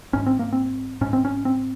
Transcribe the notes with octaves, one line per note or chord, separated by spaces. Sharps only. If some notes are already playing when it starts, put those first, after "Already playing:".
G#1 G#2 C#4
C4
A#3
C4
G#1 G#2 C#4
C4
C#4
C4